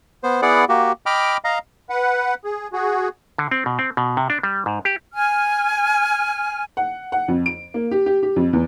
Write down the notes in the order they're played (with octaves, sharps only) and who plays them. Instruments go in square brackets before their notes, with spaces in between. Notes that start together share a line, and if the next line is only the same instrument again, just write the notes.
[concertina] B3 C5
B3 E4 G#4 D5 F#5
A#3 F#4 G4
D#5 G5 B5 D6 F6
D#5 F5 A#5
[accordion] B4 F#5
G#4
F#4 G#4
[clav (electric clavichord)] D3
C4
B2
C4
B2
C3
D4
G3
G#2
G4
[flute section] G#5 F6
[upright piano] F#5
F#5
F2
D7
A#3
G4
G4
G4
F2
E2